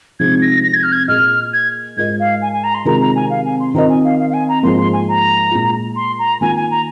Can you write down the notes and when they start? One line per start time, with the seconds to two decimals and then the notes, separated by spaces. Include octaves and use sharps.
0.19 C3 F3 G#3 C4 D#4 G#6
0.41 A#6
0.64 A#6
0.73 G#6
0.83 F6
0.92 G#6
1.07 A#2 A#3 G#4 D#5 F6
1.53 G#6
1.97 G#2 G#3 F4 A#4 D#5 G#6
2.19 F5
2.41 G#5
2.52 G#5
2.63 A#5
2.74 C6
2.85 C3 D#3 G#3 F4 A#4 A#5
3.00 A#5
3.15 G#5
3.30 F5
3.45 G#5
3.59 C6
3.74 D#3 C4 F4 A#4 D#5 A#5
3.88 G#5
4.04 F5
4.19 F5
4.29 F5
4.33 G#5
4.48 A#5
4.63 G#2 F3 A#3 C6
4.77 C6
4.92 G#5
5.08 A#5
5.51 A#2 G#3 F4
5.96 C6
6.18 A#5
6.41 D#3 A#3 F4 G#5
6.55 G#5
6.70 A#5